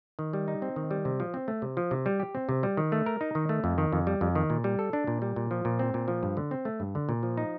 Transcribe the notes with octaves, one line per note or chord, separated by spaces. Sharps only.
D#3
G3
D#4
C4
D#3
G3
C3
F3
C4
A3
C3
F3
C3
G3
G4
C4
C3
G3
D#3
A3
A#4
D#4
D#3
A3
F2
D#3
F2
G3
F2
D#3
A#2
G3
A4
D4
A#2
G3
A#2
F3
A#2
C4
A#2
F3
G2
D3
C4
A3
G2
D3
A#2
F3
D#4